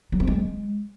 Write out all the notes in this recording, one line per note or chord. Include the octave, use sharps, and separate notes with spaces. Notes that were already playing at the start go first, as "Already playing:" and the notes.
F#3
C4
G#3